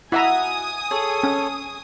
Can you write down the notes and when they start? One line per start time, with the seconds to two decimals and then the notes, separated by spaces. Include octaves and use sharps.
0.12 E4 F#4 D#5 E5 G#5 A#5 D#6
0.91 G#4 A4 C#5
1.23 C#4